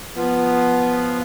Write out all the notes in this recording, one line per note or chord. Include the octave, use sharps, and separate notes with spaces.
F3 B3